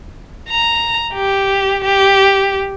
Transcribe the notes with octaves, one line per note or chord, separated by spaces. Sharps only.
A#5
G4
G4